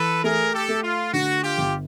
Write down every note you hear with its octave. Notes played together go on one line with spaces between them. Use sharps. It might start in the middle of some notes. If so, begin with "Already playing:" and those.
Already playing: E3 A4 B4
A3 G#4 A#4
G4 A4
A3
F4
D3 F#4
F4 G4
G1